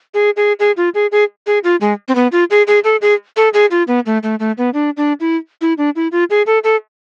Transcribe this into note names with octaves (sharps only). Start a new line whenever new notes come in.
G#4
G#4
G#4
F4
G#4
G#4
G#4
F4
G#3
C4
B3
F4
G#4
G#4
A4
G#4
A4
G#4
F4
B3
A3
A3
A3
B3
D4
D4
E4
E4
D4
E4
F4
G#4
A4
A4